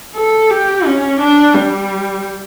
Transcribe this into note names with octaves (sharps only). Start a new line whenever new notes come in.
A4
G4
C#4
D4
G3